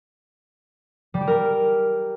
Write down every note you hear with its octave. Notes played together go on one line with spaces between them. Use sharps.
G3
G4
A#4